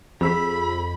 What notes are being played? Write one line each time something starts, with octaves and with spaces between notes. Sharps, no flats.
F2 G#4 B5 E6 B6